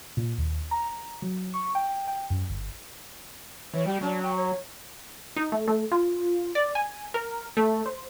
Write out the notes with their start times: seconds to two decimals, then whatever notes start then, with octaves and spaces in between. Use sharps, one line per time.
0.17 A#2
0.38 D#2
0.71 A#5
1.22 F#3
1.54 C#6
1.75 G5
2.08 G5
2.30 F#2
2.50 G1
3.74 E3 C#5
3.86 G3 G4
4.01 F#3 D4
4.22 G5
4.36 C#5
5.36 D#4
5.52 A3
5.68 A3
5.92 F4
6.55 D5
6.75 G#5
7.14 A#4
7.57 A3
7.86 C5